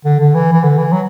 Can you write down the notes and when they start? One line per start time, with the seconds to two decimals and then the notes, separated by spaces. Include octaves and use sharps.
0.05 D3
0.20 D3
0.34 E3
0.53 E3
0.63 D3
0.78 E3
0.92 F#3